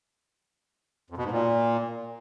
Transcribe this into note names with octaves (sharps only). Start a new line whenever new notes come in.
F2
B2
G#2
A#2